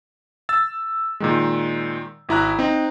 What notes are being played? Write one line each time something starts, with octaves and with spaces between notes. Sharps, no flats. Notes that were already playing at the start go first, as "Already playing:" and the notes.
E6 A6
A#2 D#3 G#3
G#1 E4 A#5 F#6
C4 D#4